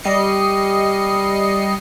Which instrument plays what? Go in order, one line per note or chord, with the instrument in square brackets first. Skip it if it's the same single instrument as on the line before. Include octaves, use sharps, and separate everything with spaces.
[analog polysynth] G3 D#5 C7 C#7